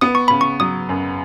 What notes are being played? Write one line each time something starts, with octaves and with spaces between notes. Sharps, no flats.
B3 D#6
C#6
C#3 B5
C#6
F#3 D#6
F#2